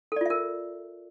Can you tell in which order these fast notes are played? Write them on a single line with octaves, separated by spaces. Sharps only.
A4 D5 F4 E5 A#4